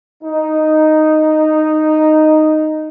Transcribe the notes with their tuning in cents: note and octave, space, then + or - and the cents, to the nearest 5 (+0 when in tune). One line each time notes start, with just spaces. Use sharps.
D#4 -5